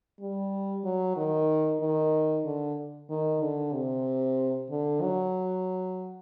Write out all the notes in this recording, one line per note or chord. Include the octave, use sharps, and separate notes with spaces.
G3
F#3
D#3
D#3
D3
D#3
D3
C3
D3
F#3